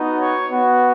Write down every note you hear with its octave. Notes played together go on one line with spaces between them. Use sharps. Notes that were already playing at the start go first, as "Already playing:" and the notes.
Already playing: B3 D#4 F#4
C#5
B3 F#4